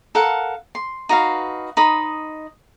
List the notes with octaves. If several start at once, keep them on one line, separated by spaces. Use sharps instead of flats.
A4 A#4 F5 F#5
C6
D#4 F#4 B4 F5
D#4 C5 B5 D#6